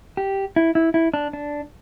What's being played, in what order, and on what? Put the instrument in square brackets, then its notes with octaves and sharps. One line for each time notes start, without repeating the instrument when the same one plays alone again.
[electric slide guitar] G4
E4
E4
E4
D4
D4